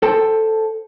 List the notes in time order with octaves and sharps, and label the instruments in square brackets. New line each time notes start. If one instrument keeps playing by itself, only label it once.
[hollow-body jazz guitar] A4 C5 G5 A5